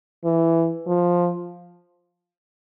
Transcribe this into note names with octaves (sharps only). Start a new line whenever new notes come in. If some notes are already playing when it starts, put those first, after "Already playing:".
E3
F3